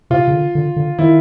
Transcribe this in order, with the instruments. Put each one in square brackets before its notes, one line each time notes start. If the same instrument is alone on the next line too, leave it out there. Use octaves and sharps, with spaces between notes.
[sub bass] C3 [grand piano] F4
[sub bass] C#3
D3
D3
D3
[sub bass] D#3 [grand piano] E4